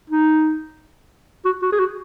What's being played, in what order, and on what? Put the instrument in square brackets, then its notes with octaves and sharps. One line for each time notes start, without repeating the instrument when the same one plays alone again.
[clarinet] D#4
F#4
F#4
G#4
F#4